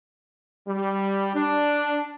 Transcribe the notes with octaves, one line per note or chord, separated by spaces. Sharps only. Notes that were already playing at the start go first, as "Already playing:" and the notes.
G3
D4